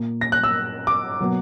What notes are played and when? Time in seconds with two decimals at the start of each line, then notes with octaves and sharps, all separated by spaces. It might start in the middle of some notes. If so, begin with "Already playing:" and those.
Already playing: A#2 A#3
0.21 A#6
0.32 F#6
0.44 E6
0.87 D6
1.21 B2 F#3 A#3